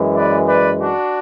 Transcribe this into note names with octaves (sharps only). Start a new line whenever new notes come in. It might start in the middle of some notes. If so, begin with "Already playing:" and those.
Already playing: F#2 E3 G#3
B4 D5
B4 D5
D4 F#4